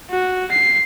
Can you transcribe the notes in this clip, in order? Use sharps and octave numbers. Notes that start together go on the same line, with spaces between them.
F#4
C7